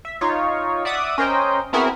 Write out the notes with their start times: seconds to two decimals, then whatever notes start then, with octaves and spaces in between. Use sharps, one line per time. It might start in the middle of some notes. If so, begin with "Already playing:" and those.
0.05 E5
0.21 D#4 F4 C#5
0.85 D5 E5 F#5 D6 D#6
1.18 C#4 A#4 C5 D#5 G5
1.73 B3 C4 E4 F#4 G#4 A#4